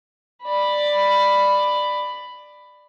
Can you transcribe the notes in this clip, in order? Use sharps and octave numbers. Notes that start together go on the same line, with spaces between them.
D5 B5